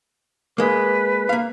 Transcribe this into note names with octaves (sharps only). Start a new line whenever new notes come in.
G#3 A#3 B4
A#3 F5